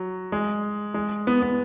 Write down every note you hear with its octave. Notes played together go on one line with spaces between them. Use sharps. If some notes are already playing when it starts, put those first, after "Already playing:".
Already playing: F#3
G#3
G#3
B3
B3